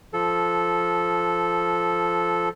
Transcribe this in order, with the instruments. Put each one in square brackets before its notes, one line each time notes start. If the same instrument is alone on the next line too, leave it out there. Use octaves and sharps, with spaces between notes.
[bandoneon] F3 A4